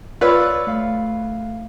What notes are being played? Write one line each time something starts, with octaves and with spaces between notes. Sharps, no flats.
F4 B4 C#5 D5 E6
A3 F5